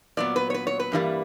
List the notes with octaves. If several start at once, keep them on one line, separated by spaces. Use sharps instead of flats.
A#2 F#3 B3 D5
B4
C#5
B4
C#5
B4
G2 E3 G3 A#3